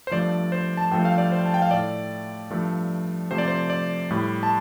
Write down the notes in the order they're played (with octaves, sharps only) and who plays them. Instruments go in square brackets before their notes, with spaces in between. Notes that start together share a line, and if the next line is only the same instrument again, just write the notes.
[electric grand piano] C5
G2 F3 A3 D5
C5
A5
G2 F3 A3 G5
F5
D5
C5
A5
G5
F5
A2 A3 D5
G2 F3 A3
C3 F3 A3 C5
D5
C5
D5
A2 G3
A5